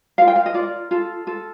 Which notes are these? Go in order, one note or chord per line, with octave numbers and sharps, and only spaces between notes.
F4 A#4 F5
G5
F5
D#5
F4 A#4 D5
F4 A4
F4 A4